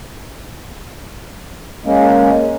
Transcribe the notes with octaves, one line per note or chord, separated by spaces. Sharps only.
G#3 A#3 C#4